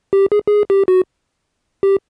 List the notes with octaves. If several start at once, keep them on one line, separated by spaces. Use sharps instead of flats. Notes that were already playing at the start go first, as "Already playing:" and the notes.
G4
G#4
G#4
G4
F#4
G4